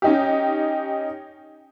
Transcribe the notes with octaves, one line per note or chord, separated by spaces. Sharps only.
C#4 D#4 G4